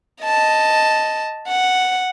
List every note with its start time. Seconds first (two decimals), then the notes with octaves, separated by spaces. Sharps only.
0.24 D#5 A5
1.48 F#5